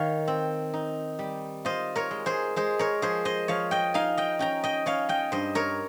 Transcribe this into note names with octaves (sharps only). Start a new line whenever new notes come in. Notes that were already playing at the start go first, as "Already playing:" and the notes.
Already playing: D#3 C#5 F5
C4
D#4
G3
F4 C5 D#5
A#4 C#5
G#3
G#4 C5
G#3 G#4 C5
A#4 C#5
F3 G#4 C5
C5 D#5
F3 C#5 F5
D#5 G5
D#4 F5 G#5
D#5 G5
C#4 G5 A#5
D#5 G5
C#4 C#5 F5
D#5 G5
G2 C5 D#5
A#4 C#5